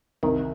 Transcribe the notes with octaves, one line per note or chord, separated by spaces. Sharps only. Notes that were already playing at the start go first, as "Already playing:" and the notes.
C2 D#3